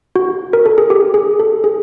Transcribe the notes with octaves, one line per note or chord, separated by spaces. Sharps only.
F#4
A#4
A4
G#4
G4
G#4
A4
G#4